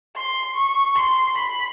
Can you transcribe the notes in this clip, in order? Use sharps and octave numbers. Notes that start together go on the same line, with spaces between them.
C6
C#6
C6
B5